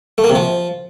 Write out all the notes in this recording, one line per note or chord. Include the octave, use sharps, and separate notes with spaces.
A3
A#3
C3
F3